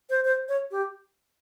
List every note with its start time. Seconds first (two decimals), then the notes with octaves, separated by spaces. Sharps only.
0.10 C5
0.25 C5
0.49 C#5
0.71 G4